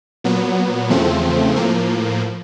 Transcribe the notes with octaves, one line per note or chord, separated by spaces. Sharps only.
A#2 F#3 B3
E2 C#3 F3 A3 C4
A2 F3 A#3